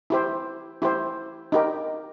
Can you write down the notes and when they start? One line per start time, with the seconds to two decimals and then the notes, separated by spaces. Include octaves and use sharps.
0.10 E4 G4 C5
0.82 E4 G4 C5
1.52 D#4 G4 A#4